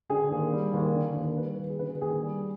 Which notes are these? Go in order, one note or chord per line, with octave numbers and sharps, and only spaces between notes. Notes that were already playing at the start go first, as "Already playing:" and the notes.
D3 G#4
D#2
G3
D#2
D3
D#2
G3 B4
D#2
G#4
D3 B4
G#4
D#2 G#4
G3